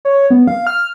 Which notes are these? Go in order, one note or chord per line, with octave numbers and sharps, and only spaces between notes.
C#5
B3
F5
F6